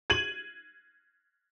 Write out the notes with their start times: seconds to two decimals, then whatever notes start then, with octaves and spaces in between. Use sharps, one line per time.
0.10 G#6 D#7 F#7